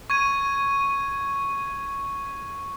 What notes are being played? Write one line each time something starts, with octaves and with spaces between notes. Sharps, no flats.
C#6 G#6 D#7